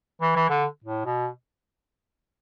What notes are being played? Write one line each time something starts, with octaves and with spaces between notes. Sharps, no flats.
E3
E3
D3
A2
B2